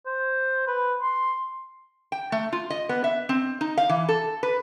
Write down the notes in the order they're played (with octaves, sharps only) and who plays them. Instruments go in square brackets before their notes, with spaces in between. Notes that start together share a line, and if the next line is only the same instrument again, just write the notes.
[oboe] C5
B4
C6
[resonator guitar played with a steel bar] G5
A3
F4
D#5
B3
E5
C4
D#4
F5
E3
A4
B4